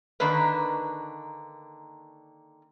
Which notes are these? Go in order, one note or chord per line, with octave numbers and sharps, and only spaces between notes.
D3 D#3 A#3 D4 B4